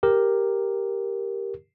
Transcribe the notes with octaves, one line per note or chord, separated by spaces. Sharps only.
G4 A#4